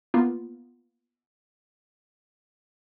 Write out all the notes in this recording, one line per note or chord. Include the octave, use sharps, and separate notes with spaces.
A#3 B3 F4